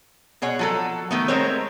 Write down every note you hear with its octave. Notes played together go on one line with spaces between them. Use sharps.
B2 G#4 C#5 F#5
F3 F#3 A4
D#3 A3 B3
G#3 A3 C4 A#4 C5 C#5